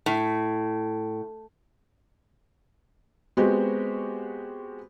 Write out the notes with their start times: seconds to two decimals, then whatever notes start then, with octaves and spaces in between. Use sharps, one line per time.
0.06 A2
3.37 G#3 B3 C4 F#4 G4